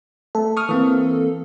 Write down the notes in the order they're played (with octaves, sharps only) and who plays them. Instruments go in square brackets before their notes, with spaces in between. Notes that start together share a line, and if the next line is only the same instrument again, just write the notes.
[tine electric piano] A3 [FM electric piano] A4
[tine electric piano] C#6 D#6 F6
E3 A#3 C4